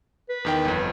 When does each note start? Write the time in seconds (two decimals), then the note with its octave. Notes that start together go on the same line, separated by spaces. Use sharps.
0.29 B4
0.45 E2 D#3 G5
0.65 G1 F2